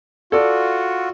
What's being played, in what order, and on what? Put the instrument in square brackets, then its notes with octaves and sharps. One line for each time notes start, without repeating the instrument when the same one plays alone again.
[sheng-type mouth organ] F4 F#4 [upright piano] A4 D5